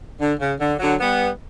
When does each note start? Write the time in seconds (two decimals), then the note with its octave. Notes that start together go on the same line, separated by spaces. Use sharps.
0.19 D3
0.39 C#3
0.59 D3
0.79 D3 F#3
1.00 G3 B3